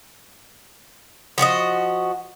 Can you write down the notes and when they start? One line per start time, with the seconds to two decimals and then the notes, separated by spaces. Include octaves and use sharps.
1.38 F3 F#4 D5 D#5